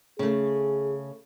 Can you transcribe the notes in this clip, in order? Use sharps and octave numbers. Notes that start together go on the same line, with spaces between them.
C#3 A3 G#4